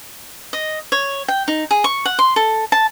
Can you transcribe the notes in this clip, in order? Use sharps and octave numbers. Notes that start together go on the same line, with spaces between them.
D#5
C#5
G5
D#4
G#4
C#6
F#5
C6
A4
A5